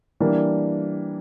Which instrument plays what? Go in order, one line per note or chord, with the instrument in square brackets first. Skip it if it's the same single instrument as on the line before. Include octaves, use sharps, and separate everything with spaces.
[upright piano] E3 G3 A#3 D4